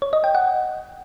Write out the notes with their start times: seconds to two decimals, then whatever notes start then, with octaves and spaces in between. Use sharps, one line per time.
0.02 C#5
0.13 D#5
0.24 G5
0.35 F#5